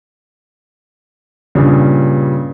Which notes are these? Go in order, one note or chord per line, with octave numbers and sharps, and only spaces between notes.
G2 A#2 C#3 G3 D4